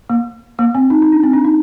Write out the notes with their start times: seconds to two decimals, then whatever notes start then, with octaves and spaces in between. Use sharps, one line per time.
0.10 A#3
0.59 A#3
0.75 C4
0.90 D#4
1.02 D#4
1.12 D4
1.23 C4
1.34 D4
1.44 D#4